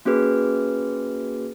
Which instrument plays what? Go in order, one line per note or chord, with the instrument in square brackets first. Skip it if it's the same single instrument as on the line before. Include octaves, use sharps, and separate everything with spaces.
[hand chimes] A#3 C#4 F#4 G#4 B4